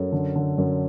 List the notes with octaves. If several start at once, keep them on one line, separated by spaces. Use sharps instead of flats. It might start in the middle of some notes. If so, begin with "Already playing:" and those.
Already playing: F#2 A4
D3
D3
F#2